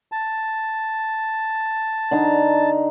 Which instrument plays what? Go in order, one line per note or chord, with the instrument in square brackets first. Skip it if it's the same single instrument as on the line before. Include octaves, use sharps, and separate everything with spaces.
[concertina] A5
[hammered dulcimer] D3 D#4 A#5